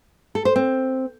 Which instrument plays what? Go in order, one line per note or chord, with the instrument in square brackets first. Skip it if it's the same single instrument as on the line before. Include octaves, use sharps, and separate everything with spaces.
[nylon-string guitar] A4
C5
C4